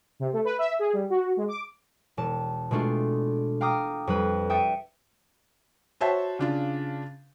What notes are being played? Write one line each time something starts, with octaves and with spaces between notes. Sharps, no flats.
C3
A3
B4
E5
G#4
G3
F#4
G#3
D6
E1 A5
B2 G#3 A3 D4 F4
F5 G5 A#5 D6 D#6 F6
F2 G3 B4
E5 G5 D#6 A6 C#7 D#7
F#4 C5 C#5 E5 A5
C#3 D4 F4